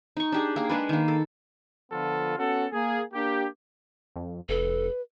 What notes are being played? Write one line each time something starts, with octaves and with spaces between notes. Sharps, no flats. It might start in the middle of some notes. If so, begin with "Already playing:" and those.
D#4 C#6
D4 G4 G#4
A#3 G#4
G#3 D4 B4
D#3 A#3
A4
D3 F3 B3 F4 A4
B3 C#4 F#4 A4
A#3 G#4
A#3 D4 G4
F2
F1 A4 B4